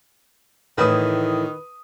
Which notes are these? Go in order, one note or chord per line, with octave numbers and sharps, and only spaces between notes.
A2 D#3 E3 B4 D#6